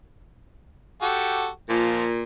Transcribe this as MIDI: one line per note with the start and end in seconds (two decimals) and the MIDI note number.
1.02 1.48 66
1.02 1.48 67
1.02 1.48 69
1.69 2.23 46
1.69 2.04 53